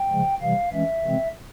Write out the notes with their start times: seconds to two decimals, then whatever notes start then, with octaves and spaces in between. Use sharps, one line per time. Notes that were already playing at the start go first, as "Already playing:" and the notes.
Already playing: G5
0.11 C#3 F3 G#3
0.41 C3 E3 G3 F5
0.72 E3 G#3 C#4 E5
1.04 C3 E3 G#3 C4